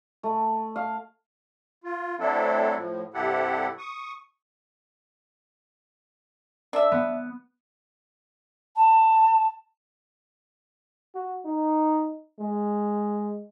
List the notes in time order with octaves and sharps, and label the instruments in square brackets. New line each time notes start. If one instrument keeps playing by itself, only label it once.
[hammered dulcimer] A3
F5
[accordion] F4
F#3 A3 C4 D4 E4 A4
A2 F3
G2 C3 E4 G4 A4 F#5
C#6 D#6
[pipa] D4 E5
[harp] B3
[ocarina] A5
[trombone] F#4
D#4
G#3